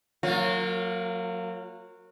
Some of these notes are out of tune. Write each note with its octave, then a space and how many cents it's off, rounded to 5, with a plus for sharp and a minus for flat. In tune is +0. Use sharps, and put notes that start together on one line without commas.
F#3 -20 A#3 -25 F4 +30